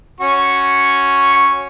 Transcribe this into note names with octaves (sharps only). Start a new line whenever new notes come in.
C#4 F#4 C#6